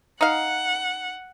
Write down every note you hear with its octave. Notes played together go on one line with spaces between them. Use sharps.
D#4 F5 F#5